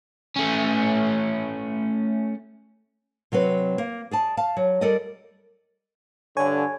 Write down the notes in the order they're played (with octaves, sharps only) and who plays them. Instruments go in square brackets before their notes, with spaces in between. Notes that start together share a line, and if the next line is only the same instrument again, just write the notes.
[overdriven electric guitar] A3 C#4
[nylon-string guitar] C3 F#3 C4 B4
A#3
G#4 D5 A5
F5 A5
F#3
G3 A4 A#4 D5 D#5
[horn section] G2 D3 [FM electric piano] C#5 G#5